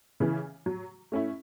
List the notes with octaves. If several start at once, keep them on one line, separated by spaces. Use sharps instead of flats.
C#3 E3
F#3
A3 C#4 E4